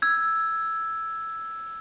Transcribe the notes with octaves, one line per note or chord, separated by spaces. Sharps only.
E6 G#6